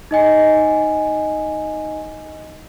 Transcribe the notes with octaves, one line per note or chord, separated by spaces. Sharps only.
D#4 D#5 G#5